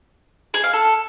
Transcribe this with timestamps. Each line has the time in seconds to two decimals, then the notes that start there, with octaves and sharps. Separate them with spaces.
0.54 G#4
0.64 F5
0.73 A4